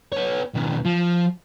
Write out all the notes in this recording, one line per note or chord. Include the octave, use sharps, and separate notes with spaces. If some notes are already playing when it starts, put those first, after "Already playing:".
B3 C#5
D#2 B2
F3